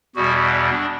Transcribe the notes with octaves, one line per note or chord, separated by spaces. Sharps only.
E2 B2 G3 F#4
D4